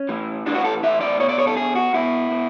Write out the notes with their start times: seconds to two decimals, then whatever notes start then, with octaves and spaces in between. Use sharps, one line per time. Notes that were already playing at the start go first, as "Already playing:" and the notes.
Already playing: C#4
0.09 A2 E3
0.46 A2 E3 D4
0.55 F#4
0.65 A4
0.83 A2 E3 E5
1.01 D5
1.19 B2 C#5
1.29 D5
1.38 C#5
1.47 A4
1.57 B2 G#4
1.75 F#4
1.93 B2 E4
2.30 B2